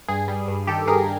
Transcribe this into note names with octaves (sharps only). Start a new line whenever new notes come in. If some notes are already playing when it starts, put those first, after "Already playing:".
G2 G#4
G3
G2
D#3 G4 A4
G2 G#4 A#4